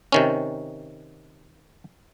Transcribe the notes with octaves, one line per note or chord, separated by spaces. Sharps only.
C3 D#3 C#4